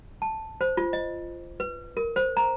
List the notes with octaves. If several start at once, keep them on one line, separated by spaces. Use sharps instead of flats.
A5
C5
F4
D#5
B4
A#4
C5
A#5